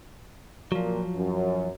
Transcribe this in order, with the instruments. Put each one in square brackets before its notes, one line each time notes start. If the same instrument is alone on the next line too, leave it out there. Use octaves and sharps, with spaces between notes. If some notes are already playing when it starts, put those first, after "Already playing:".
[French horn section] A#2 [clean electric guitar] F3 F#3
[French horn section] F#2